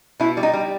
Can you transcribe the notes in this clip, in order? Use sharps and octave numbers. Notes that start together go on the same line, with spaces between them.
B2 E4
G3
D#4
G3